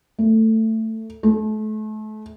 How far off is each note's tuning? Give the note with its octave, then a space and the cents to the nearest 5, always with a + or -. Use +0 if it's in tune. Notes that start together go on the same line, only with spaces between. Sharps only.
A3 +15
A3 -35